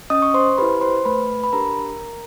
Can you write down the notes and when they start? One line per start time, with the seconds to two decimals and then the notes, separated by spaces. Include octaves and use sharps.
0.10 C#4 D#5 D#6
0.22 C#6
0.34 C5 C6
0.58 E4 G4 B4 B5
0.81 C5 C6
1.05 A3 B4 B5
1.44 B5
1.53 D4 G4 A#4 A#5